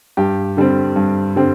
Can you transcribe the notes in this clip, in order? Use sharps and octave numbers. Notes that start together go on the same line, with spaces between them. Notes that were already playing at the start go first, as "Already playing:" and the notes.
G2 G4
D3 G3 C4
G2
D3 G3 C4